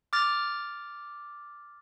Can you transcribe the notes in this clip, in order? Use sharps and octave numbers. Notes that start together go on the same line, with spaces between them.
D6 F6 A6